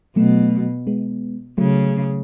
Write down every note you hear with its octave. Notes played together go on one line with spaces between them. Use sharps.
B2 F#3 A3
G#3 B3
C#3 F#3 A3